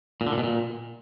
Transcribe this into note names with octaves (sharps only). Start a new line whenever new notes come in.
A#2
D3
A#2
B2
A#2